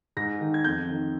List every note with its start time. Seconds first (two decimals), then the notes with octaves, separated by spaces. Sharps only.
0.17 G#2 A#6
0.41 D#3
0.54 G#6
0.64 F2 G6
0.89 D#3